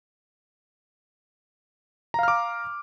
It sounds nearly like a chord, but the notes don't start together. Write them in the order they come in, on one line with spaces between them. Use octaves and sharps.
A#5 F5 F6 D6